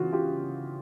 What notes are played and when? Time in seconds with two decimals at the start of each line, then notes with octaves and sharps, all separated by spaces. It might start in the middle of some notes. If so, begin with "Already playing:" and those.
Already playing: C#3 E3 F4 F#4
0.12 F4 G4